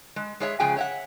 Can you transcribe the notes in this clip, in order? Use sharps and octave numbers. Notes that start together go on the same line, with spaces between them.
G#3
G#3 G#4 C#5 E5
C#3 F3 G#3 G#4 G5 G#5
C#5 E5 F#5